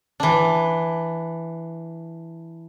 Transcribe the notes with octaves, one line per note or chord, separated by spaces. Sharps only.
E3 D4